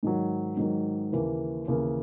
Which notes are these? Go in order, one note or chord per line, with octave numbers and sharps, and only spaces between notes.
G#2 D#3 F#3
G#2 D#3 F#3
D#2 C#3 E3 A#3
D#2 C#3 E3 A#3